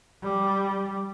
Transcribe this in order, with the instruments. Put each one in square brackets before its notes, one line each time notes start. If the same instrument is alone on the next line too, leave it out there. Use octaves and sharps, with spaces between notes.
[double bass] G3